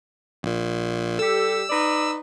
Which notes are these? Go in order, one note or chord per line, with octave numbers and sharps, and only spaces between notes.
A#1 A#2
G3 G4 A4 E6
D#4 B4 D5